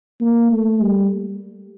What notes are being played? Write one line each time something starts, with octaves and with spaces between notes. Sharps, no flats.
A#3
A3
G3